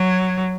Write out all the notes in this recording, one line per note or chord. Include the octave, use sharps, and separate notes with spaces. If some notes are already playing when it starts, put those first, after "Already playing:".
Already playing: F#3